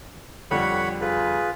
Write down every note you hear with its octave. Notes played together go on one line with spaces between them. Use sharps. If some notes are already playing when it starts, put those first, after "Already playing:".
F2 D3 G3 C#5 F#5 B5
F4 G#4 B4